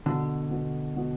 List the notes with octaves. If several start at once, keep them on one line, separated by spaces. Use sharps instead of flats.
B2 D3
B2
B2